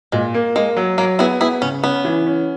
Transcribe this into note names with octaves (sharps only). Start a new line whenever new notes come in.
A#2 G#3
A#3
G#3 A#3
F#3
F#3 A#3
B3 E4 G#4
B3 E4 G#4
C#3 C#4
B3 C#4
E3
C#4